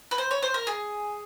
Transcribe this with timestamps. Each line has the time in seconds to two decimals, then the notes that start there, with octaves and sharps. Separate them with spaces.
0.11 B4
0.18 C5
0.31 C#5
0.42 C5
0.54 A#4
0.67 G#4